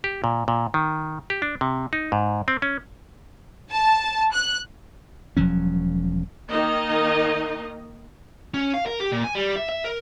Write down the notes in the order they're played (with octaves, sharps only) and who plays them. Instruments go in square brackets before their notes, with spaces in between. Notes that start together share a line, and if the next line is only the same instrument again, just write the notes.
[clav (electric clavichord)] G4
A#2
A#2
D#3
G4
D4
C3
D#4
G#2
C4
C#4
[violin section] A5
F#6
[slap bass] E1 F3 F#3 C#4
[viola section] D#3 A#3 D#4 D#5
[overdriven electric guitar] C#4
F5
A#4
G4
A#2
G#5
G3
E5
E5
A#4